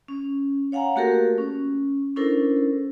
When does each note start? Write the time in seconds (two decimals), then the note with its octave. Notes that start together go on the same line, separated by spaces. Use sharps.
0.08 C#4
0.72 C#5 F5 F#5 G#5 A#5
0.96 A3 A#3 F#4 G4 A4 A#4
1.38 C#4
2.16 C#4 D4 E4 A4 A#4 C5